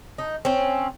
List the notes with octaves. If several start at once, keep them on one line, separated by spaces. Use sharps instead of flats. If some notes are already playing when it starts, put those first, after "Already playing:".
D#4
C4 C#4